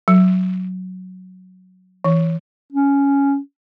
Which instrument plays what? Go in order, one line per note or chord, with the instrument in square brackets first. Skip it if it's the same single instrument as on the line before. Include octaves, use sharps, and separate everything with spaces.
[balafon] F#3
E3
[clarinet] C#4